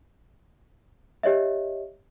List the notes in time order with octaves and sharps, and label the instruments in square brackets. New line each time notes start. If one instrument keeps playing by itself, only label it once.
[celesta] G4 C#5 D#5 E5